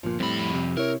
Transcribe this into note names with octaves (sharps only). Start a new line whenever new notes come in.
G1 A#2 F3
F2 A2 G3 C4 B5
C3
E4 A#4 C#5